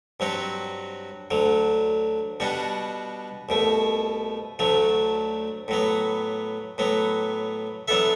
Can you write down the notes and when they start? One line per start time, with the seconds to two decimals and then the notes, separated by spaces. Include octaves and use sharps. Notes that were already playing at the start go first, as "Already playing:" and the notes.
0.20 G2 F#3 C4 F#4
1.31 D2 D3 F#3
2.40 B2 G3 D4 F#4
3.49 C2 B2 A3
4.59 D2 D3 F#3 A3
5.68 A2 F#3 B3
6.78 A2 F#3 B3
7.88 F#3 B3 D4 A4 E5